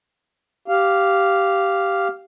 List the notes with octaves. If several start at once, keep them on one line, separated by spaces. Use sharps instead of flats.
G4 F5